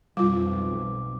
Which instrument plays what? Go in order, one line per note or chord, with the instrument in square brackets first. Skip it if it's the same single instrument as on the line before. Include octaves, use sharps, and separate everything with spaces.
[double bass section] B1 F2 [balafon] G3 F4 [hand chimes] D6